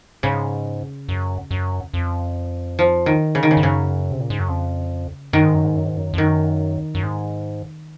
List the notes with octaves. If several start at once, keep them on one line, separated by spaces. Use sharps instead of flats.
G#2 C#3
F#2
F#2
F2
F3
D#3
C#3
D#3
C#3
G#2
F#2 C#3
C3
A#2
G#2
F#2
F2
F#2 D#3
G#2
F#2
G#2
F#2
G#2
F#2
F2
F#2 D#3
F#2
G#2